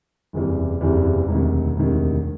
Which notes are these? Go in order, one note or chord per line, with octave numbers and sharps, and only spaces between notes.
F#1 E2 C3 E3 G3
F#1 E2 C3 E3 G3
E1 D2 C3 D#3
E1 D2 C3 D#3